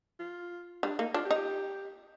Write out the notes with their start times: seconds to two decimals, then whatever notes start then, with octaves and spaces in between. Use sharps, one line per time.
0.19 F4
0.83 G3 D4
0.99 A#3 D#4
1.14 D4 F4
1.25 G4
1.31 D#4
1.36 G4